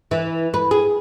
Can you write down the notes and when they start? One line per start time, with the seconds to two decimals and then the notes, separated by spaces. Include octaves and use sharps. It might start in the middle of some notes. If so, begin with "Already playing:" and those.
0.11 E3
0.54 B4
0.71 G#4